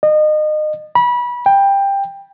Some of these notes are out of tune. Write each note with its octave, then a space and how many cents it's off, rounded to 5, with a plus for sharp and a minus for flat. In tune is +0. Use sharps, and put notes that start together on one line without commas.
D#5 -30
B5 -25
G5 +15